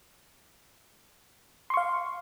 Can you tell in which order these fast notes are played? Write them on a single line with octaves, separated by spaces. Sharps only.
C6 C#6 F5